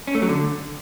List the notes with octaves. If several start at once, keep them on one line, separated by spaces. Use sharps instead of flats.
C#4
A3
F#3
D3